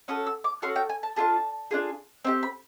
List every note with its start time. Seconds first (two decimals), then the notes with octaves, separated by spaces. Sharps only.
0.08 C#4 F#4 A4 D#6
0.27 E6
0.44 D6
0.62 C#4 F#4 A4 C6
0.76 G5
0.89 G#5
1.03 A5
1.16 D4 F4 G#4 A5
1.71 D4 F4 G#4
2.25 C4 E4 G4
2.43 B5